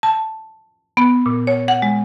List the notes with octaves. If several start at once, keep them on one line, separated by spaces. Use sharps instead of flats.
A5
B3
A#2
C#5
F#5
G#3